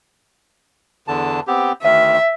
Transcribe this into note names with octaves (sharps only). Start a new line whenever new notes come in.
E2 D3 A5
B3 C4 G4
D2 D#3 E5